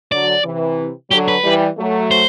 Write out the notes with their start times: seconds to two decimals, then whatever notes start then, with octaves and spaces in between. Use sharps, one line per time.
0.12 D3 F#3 D5
0.44 C3 E3
1.11 D3 F#3 G4
1.28 B4
1.44 E3 G3
1.78 F#3 A3
2.11 C5